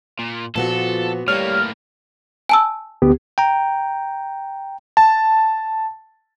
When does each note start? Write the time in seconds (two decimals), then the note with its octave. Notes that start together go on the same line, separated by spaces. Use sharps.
0.19 A#2
0.56 A#2 F3 B3 F#4 A4
1.28 A2 G3 A#3 C#5 F6
2.49 G#5 A5 E6
3.02 D2 B3 G4
3.38 G5 A#5
4.97 A5